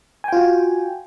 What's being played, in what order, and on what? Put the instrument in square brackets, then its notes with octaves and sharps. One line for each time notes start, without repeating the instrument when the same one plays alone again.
[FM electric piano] G#5
G5
F4
F#4